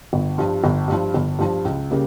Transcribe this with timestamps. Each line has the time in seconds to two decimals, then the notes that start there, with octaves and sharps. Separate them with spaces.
0.13 G1
0.38 G2 F3
0.64 G1
0.88 G2 F3
1.14 G1
1.39 G2 F3
1.65 C#2
1.91 C#3 G3 A#3